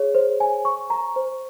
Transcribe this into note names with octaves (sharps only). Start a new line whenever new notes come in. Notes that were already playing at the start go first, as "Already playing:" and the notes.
Already playing: G#4 C#5
C5
G#5
C#6
A#5
C5